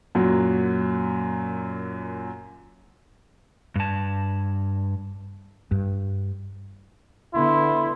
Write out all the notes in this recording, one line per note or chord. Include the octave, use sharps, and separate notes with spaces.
F#2 A#2 F#3
G2 A5
G2
D3 B3 E4 C6